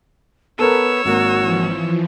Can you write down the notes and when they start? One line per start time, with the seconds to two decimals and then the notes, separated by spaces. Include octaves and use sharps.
0.59 B3 A4 A#4 C#5 E6
1.05 G#1 A#3 F#4
1.40 E3 F3